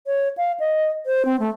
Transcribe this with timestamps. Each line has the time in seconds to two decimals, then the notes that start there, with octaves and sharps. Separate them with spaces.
0.07 C#5
0.38 F5
0.60 D#5
1.06 C5
1.25 C4
1.40 A3